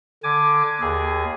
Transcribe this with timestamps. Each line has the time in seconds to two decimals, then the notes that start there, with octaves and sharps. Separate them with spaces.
0.24 D3 G#5 D6
0.81 D#2 G#4